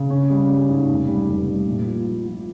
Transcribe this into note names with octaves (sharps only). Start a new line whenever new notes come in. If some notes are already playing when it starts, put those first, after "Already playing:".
Already playing: C#3
C#4
G3
G3
G#2
F1
G3
F1
G3
A#1
F3
F3
F3